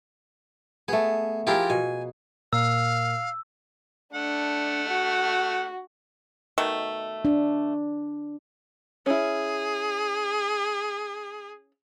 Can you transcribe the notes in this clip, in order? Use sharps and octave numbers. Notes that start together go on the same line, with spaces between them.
A3 B3 G#4
F3 E4 F4 G4 G#4 A#4
B2 G#5
A#2 F5 E6
A3 D4 F#5
F#4
B2 D#3 A3
D4
C#4 E4 G#4